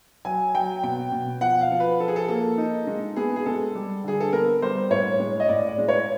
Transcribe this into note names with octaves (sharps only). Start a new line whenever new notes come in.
F#3 G#5
F#3 G5
B2 G5
B2
F3 F#5
F5
F3
B4
F3 A4
G#4
A4
A#3 A4
D#4
G#3
B3 G#4
G#4
G#3 A4
G3
D3 G#4
A4
B3 A#4
G3 C5
A2 C#5
G#3
D#5
A2 D5
D5
G#3
C#5